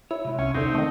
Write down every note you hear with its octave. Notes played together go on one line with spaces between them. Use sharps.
E4 C#5
C3 G#3
C2 C#4
E2 D3 C4 D#4
D#3 A3